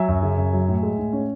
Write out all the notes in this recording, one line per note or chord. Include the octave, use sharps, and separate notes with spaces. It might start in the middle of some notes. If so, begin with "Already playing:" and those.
Already playing: F#3 E5 G#5
F#2
C#3
F#2
F#3
A2
G#3
A2
C#4